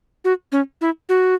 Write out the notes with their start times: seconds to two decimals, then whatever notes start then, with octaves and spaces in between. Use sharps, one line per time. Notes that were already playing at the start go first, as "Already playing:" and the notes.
0.24 F#4
0.52 C#4
0.81 E4
1.09 F#4